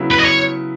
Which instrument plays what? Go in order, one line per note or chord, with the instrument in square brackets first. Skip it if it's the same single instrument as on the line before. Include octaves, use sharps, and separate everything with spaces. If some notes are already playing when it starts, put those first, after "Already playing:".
Already playing: [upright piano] C#3 F#3 B3 E4
[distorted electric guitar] B4
D#5
C#5